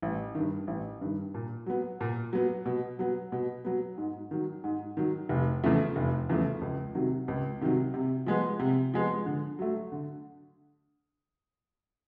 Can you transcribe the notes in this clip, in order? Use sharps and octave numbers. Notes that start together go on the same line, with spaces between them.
A1
G2 D#3
A1
G2 D#3
A#2
F#3 B3
A#2
F#3 B3
B2
F#3 B3
B2
F#3 B3
G#2
D#3 F#3
G#2
D#3 F#3
F1
E2 C#3 F3 A3
F1
E2 C#3 F3 A3
C#2
C3 D#3 F#3
C#2
C3 D#3 F#3
C3
F3 G#3 B3
C3
F3 G#3 B3
D3
F#3 A3
D3